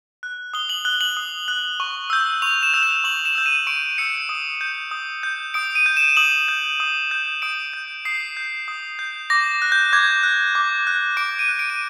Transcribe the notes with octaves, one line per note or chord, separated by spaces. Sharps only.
F#6
D#6 G7
F#7
F#6 G7
F#7
D#6
F#6
C#6
E6 G6
C#6 F7
E7
E6 G6
F7
C#6 F#7
E7
E6 G6
D#7
C#6 D7
E6 G6 C#7
D#6
G6
D#6
G6
D#6 D7
D#7
G6
E7
D#6 F#7
G6
D#6
G6
D#6 D7
G6
D#6 C7
G6
D#6
G6
D6 A#6
F#6
G6
D6 G#6
F#6
D6
F#6
D6 D7
D#7
F#6
D7
D#7